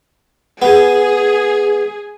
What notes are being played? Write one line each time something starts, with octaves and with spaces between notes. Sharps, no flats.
B3 G#4